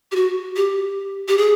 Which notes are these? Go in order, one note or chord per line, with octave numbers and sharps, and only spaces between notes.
G4
F#4
G4
G4
G#4